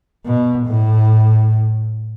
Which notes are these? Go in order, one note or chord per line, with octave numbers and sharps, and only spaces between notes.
B2
A2